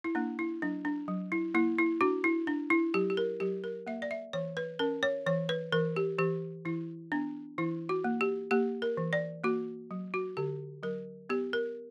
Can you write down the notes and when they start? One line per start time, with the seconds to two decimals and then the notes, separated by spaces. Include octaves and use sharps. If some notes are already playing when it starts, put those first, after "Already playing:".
0.04 E4
0.15 A#3 D4
0.39 E4
0.62 F#3 D4
0.85 D4
1.08 F#3
1.32 E4
1.54 A#3 E4
1.78 E4
2.01 D4 F#4
2.24 E4
2.47 D4
2.70 E4
2.94 F#3 G4
3.10 G4
3.17 A#4
3.40 F#3 G4
3.64 A#4
3.87 A#3 E5
4.02 D5
4.11 E5
4.33 E3 C#5
4.57 B4
4.79 C#4 A#4
5.03 C#5
5.26 E3 C#5
5.49 B4
5.72 E3 A#4
5.96 G4
6.18 E3 G4
6.65 E3 E4
7.12 B3 D4
7.58 E3 E4
7.89 F#4
8.04 A#3
8.21 G4
8.51 A#3 G4
8.82 A#4
8.97 E3
9.13 D5
9.44 A#3 F#4
9.91 F#3
10.14 F#4
10.37 D3 G4
10.83 F#3 A#4
11.29 B3 G4
11.53 A#4